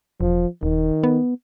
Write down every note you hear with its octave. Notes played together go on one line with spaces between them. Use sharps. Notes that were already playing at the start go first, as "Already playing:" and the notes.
E1 F3
D#1 D#3
B3